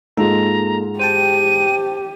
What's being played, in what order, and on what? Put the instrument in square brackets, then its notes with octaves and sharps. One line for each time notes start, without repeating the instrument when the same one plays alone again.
[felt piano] G#2 G#3 F4 [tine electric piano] A#3 D#4 A4 [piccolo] A#5
[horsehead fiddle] G4 [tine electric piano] C5 G5 A5 [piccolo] D#7